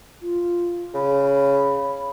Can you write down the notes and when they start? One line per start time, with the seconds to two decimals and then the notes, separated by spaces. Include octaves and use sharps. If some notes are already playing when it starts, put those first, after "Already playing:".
0.22 F4
0.95 C#3 B5